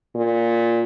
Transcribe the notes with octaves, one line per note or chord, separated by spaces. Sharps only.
A#2